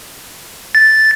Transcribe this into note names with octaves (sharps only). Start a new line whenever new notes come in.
A6